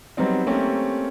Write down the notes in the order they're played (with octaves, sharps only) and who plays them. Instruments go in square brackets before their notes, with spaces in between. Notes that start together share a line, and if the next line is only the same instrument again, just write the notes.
[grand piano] F#3 G3 B3 C4 D#4
A3 A#3 C4 C#4 G4